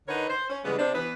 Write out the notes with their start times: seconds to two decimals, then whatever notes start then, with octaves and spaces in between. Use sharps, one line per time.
0.08 D3 D#4 A#4 B4 C#5 F#5
0.29 C5
0.50 C#4
0.65 C#3 E3 G3 G#3 B3
0.78 C3 D4
0.95 E3 B3 B4